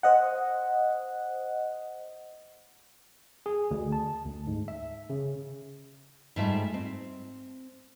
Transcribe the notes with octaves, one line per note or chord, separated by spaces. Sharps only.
C5 D#5 F#5
G#4
D2
A5
D2
G#2
E5
C#3
G#2 G3 A3 F4 E5
C4